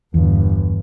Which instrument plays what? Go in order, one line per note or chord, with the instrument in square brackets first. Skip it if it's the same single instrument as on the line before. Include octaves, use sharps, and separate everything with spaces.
[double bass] G1 [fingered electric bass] E2